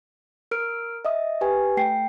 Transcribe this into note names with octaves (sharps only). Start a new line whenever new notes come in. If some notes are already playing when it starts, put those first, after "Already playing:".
A#4 F6 D7
D#5 E5 D#6
G4 B4 G#5
A3 G5 C7